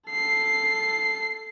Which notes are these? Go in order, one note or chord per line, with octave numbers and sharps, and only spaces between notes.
A4 C7